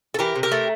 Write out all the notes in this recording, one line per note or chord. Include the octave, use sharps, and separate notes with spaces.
A4
E3 G4 A#4
C3
G4 A#4
A3